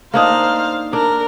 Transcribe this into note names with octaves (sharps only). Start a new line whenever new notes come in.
A#3 D4 D#4 C5 F5
D4 A#4